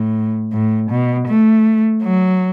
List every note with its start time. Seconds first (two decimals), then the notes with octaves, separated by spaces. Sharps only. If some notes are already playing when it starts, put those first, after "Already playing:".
Already playing: A2
0.53 A2
0.91 B2
1.28 A3
2.04 F#3